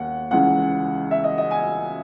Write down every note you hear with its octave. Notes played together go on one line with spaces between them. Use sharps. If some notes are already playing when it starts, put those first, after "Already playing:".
Already playing: D#2 F#5
C#2 C#3 E3 F#5
E5
D#5
D#5
G#5